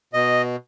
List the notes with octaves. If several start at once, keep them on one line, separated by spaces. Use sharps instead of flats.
B2 D#5